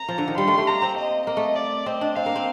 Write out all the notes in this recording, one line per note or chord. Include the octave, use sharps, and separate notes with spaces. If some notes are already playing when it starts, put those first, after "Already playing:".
Already playing: A#5
F3
D3
D#3
G3 C6
A3
A3
A#3 A#5
C4
D#5
A#3 D#5
A3
D5
C4 D#5
D4
C4 F5
A#3
C4